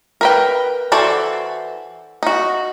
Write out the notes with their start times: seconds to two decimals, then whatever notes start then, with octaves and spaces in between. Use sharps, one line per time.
0.21 A#4 B4 G5
0.92 E3 F#4 A4 C5 D5
2.23 D#4 F#4